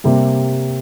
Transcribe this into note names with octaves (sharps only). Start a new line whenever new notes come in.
C3 G3 A#3